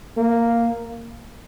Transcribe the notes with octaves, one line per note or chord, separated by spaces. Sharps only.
A#3